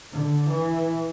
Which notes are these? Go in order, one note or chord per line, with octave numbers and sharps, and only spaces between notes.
D3
E3